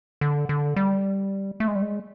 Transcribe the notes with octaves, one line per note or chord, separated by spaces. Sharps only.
D3
D3
G3
A3
G#3
G3
G#3